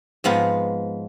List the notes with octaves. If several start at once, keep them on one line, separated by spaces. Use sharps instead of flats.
G#2 F3 G#3 B3